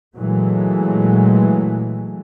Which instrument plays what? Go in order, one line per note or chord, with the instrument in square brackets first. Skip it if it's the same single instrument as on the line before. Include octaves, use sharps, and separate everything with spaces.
[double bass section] A#2 E3 F#3 G#3 A3